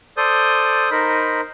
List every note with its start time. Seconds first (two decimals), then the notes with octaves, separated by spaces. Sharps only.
0.17 A4 C5 D5 D#6 G6
0.91 D#4 A#4 C5 B5